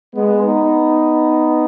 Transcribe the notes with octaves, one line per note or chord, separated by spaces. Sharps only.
G#3 B3
B3 D#4